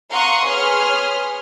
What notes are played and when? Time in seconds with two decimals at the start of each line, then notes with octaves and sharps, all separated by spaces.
0.10 F5 F#5 A#5 C6 C#6 D#6
0.45 G#4 B4 C#5 C6 D#6 F6